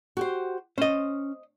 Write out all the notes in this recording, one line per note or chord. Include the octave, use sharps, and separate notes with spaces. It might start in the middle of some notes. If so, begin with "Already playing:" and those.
F#4 G4 C5
C#4 C5 D#5